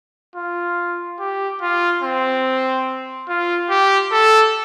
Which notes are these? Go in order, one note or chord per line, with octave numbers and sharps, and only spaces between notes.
F4
G4
F4
C4
F4
G4
A4